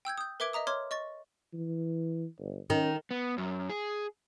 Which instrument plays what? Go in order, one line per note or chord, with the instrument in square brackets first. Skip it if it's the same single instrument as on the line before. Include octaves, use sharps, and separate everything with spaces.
[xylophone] G5 E6 G6 G#6
D#6 G6
A#4 B4 E5 D6 G#6 D7
D#5 E5 A#5 D#6
C#5 C6 D6 F6 G#6
D#5 C#6 A6
[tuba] E3
G1
[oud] D#3 [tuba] C#4
[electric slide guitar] B3
F#2
G#4